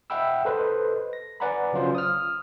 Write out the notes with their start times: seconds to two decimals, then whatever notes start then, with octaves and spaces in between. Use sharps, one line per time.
0.10 D#5 E5 F#5 G5 B5 E6
0.45 A4 B4 C5 D#5
1.13 A#6
1.40 B4 D5 F#5 G#5 A#5 B5
1.73 C#3 F#3 C#4 F4 C5
1.95 D#6 F6